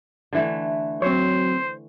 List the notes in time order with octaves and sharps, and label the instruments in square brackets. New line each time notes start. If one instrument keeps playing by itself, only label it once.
[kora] D3 E3 A3
[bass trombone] F#3 [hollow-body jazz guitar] C4 C#5 [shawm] C5